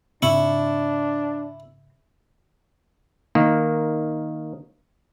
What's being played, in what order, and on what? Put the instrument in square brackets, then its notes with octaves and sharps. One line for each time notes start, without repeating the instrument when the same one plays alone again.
[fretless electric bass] G#2 C#3 C4 [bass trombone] D4 [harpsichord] E4 C#6
[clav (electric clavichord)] D#3 A#3